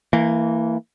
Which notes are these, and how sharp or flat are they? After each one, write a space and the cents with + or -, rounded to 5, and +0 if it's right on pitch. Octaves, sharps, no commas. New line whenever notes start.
E3 +0 A#3 -25